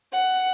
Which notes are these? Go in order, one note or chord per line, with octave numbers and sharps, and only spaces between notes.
F#5